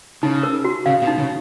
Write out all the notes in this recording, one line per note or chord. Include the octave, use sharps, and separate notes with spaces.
C#3 D#4
A#4
F#4
C#3 F5
B2
D#4
C#3